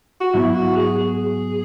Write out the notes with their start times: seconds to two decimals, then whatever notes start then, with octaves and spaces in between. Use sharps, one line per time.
0.21 F#4
0.34 G#2 F#3 B3 E4
0.55 F#4
0.76 G#4
0.99 G#4